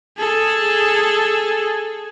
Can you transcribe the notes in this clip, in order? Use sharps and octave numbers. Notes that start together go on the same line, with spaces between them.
G#4 A4